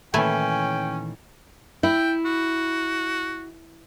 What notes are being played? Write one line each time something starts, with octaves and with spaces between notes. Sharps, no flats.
A#2 D#3 E3 A3 C#4 E4 G5 G#5
E4 G5
F#4